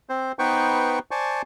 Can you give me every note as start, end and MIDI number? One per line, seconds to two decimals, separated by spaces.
0.09 0.32 60
0.09 0.32 72
0.39 0.99 59
0.39 0.99 63
0.39 0.99 71
0.39 0.99 72
0.39 0.99 79
0.39 0.99 85
1.11 1.42 72
1.11 1.42 74
1.11 1.42 80
1.11 1.42 81
1.11 1.42 85